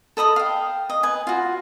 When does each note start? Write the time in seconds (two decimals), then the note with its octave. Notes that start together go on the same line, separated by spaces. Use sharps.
0.17 A4 D#5 B5 D#6
0.36 F5 G5
0.90 D#5
1.03 B4 G#5
1.27 F4 F#4